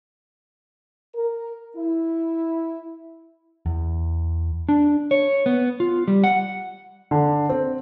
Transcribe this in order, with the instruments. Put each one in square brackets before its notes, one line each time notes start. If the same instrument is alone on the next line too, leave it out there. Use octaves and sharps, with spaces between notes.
[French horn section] A#4
E4
[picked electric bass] E2
[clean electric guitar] D4
C#5
B3
F4
G3
F#5
[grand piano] D3
C4